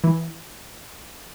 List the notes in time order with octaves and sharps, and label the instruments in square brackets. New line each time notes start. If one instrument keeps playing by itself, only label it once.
[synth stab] E3